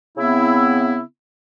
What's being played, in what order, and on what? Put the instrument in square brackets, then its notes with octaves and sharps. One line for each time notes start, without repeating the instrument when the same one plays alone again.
[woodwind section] C#3 B3 C4 E4